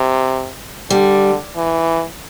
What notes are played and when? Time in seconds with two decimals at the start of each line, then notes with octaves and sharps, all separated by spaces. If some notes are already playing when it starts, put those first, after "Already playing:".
Already playing: C3
0.90 D3 G3
1.57 E3